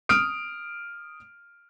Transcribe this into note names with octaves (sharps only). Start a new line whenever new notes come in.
D#6 F6 D7